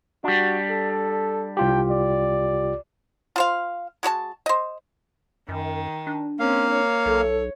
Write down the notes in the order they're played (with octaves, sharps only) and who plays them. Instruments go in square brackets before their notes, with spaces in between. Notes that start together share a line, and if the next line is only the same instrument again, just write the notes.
[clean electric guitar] G3 D4 [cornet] F#4
[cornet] A4
[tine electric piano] C2 F4 G4 [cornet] G5
[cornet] D5
[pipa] F4 C5 F5
G#3 F#4 C#5 A5
C5 D#5
[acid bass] F#2 [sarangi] D#3
[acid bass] D4
[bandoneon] A#3 F5 [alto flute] C4 [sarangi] C#4
[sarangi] C#5
[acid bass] B1 [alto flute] A4